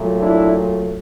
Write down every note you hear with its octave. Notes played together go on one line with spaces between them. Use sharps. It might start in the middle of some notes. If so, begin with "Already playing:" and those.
Already playing: A#2 F#3 A3
D4 E4